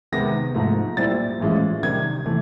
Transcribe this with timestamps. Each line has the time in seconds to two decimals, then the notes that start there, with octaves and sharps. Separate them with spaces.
0.12 C3 D#3 G#3 B3 A#6
0.54 G#2 F3 A3
0.97 A#2 G3 C4 E4 A6
1.40 A2 E3 G#3 C#4 F4
1.83 C3 D#3 G3 G#6
2.25 C3 E3 A3